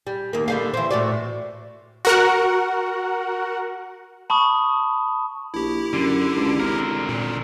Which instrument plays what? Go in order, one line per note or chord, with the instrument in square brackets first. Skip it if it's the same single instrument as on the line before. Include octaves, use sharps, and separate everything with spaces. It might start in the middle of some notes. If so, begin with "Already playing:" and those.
[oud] G3
D#2 A#3
D3 G3 F5
E3 C4
A2 F#4 D5
[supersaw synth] F#4 A#4 F#5
[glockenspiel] A5 B5 C#6 D#6
[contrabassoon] A#1 [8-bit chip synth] E4 G4
[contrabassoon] F#2 [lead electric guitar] D3
[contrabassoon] C#2
[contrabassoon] G#1 [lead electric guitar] D3 A#4
[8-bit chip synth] A#2